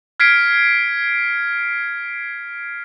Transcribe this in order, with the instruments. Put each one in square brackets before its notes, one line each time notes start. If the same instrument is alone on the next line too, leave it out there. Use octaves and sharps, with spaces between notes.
[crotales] F6 G#6 B6 C7 D7